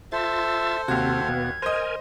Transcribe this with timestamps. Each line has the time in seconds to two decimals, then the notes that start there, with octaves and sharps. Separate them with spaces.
0.12 F4 A4 C5 E5 A6
0.88 D#2 C3 C4 F#4 G#6
1.28 B2 B3
1.62 A#4 C5 D#5 G#5